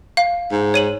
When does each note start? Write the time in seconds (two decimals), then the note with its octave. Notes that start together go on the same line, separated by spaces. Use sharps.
0.17 F5
0.52 G#2
0.74 C#5 D#7 F#7